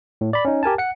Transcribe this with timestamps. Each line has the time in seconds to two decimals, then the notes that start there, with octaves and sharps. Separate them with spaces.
0.21 A2
0.33 D5 B5
0.45 C#4 D#4
0.63 G4 A#4 G#5 A5
0.78 F#5 C#7